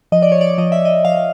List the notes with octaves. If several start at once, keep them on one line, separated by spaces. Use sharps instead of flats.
F3 D#5
D5
C#5
D5
F3 D#5
E5
D#5
F3 F5